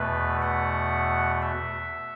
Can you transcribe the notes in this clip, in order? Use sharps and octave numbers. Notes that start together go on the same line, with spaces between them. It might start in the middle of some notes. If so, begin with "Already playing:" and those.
Already playing: E2 B2 A3 B4
F#5
E5